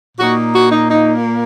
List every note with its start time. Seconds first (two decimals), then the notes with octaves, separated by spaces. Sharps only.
0.17 A#2 A#3 D#4 F#4
0.54 F#4
0.72 D#4
0.90 D#4